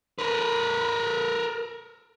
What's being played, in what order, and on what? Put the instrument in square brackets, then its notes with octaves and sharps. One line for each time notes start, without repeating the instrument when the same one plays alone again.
[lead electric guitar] A#4 B4